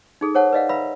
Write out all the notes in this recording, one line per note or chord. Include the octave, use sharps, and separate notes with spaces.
D#4 G#4 A4
A#4 C5 C#5 F#5 A5
B4 D5 D#5 F5 F#5
B4 E5 F5 A#5 B5 E6